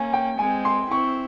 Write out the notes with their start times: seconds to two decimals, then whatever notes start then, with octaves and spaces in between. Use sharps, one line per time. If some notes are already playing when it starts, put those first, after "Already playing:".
Already playing: A#3 C#4 G#5
0.13 G5
0.39 G#3 C4 G#5
0.65 C6
0.90 C4 E4 C#6